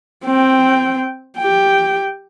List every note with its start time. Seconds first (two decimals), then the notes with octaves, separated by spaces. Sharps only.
0.25 C4 G5
1.39 G4 G5